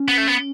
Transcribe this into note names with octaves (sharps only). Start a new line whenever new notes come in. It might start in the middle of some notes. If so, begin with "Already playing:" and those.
Already playing: C#4
B3
A3
B3